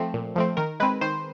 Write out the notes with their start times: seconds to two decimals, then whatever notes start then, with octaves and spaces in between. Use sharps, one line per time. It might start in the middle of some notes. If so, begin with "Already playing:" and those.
Already playing: F3 A3 C4
0.14 A#2
0.36 F3 A3 C4
0.57 D#3 A#4
0.80 G#3 C4 B4
1.01 D#3 C5